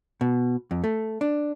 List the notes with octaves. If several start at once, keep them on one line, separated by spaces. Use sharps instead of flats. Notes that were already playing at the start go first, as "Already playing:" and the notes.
B2
F2
A3
D4